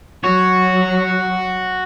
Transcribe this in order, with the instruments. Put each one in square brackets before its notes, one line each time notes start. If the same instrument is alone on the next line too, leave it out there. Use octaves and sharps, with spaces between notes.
[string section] F#3 [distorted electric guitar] F#4 [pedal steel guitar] C#5